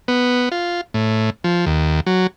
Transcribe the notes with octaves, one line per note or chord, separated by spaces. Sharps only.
B3
F4
A2
F3
D#2
F#3